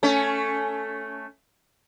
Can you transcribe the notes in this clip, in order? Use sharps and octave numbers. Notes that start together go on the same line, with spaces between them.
A3 C#4